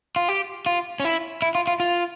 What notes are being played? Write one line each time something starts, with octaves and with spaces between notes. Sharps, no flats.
F4
G4
F4
C#4
E4
E4
F4
F4
F4